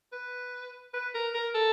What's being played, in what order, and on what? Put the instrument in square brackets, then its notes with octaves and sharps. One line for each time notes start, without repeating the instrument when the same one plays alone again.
[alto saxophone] B4
B4
A#4
A#4
A4